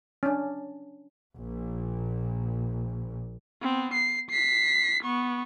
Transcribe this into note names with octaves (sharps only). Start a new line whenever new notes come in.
C#4 D4
A#1 A#2
B3 C4
C7
B6 C7
B3 C#6